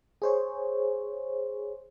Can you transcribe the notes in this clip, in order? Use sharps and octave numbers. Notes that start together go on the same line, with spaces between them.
G#4 C5 C#5